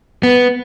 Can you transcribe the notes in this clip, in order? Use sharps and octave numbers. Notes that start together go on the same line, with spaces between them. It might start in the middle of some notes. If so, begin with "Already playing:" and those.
B3